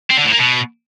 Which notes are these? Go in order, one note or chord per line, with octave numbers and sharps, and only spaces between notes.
C4
D3
A2
A#3
B2